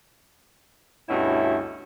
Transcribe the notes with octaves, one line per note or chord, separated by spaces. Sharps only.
D2 G2 B2 C#4 E4 E5